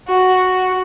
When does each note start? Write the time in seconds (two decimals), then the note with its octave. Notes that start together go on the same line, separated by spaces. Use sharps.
0.08 F#4